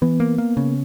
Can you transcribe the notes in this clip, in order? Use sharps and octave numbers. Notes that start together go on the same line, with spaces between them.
E3 B3
A#3
A#3
C#3